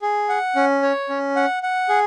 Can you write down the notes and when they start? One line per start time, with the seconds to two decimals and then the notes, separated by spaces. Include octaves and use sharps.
0.02 G#4
0.29 F#5
0.56 C#4
0.82 C#5
1.09 C#4
1.36 F#5
1.63 F#5
1.89 G#4